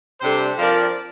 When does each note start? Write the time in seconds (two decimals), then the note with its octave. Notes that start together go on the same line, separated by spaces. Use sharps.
0.22 C3 G3 D4 A4 C5
0.58 F3 C4 F4 A#4 D5